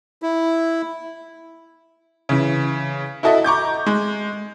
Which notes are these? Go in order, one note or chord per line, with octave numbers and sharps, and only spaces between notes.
E4
C#3 E3
E4 F#4 A4 D#5 E5
A#5 C#6 D6 G6
G#3